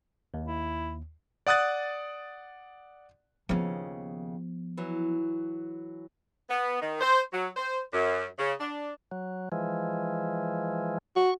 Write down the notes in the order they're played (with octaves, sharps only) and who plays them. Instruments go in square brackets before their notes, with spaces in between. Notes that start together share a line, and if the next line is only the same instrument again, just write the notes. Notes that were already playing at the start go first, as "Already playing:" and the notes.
[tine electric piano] D#2
[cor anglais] E4
[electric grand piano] D5 F#5 D#6 F#6 A6
[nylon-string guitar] D#2 C#3 C#4 [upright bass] F3 B3
[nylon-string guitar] E3 F#3
[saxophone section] B3
D#3
C5
F#3
C5
F#2
C#3
D4
[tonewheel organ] F#3
E3 F3 G#3
[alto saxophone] F#4 [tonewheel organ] C#6